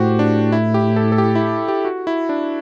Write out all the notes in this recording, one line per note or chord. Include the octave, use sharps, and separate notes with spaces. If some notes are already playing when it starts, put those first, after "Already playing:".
Already playing: A2 F#4 G4 C5
D4
E4
G4
A4
A4
G4
E4
G4
F#4
E4
D4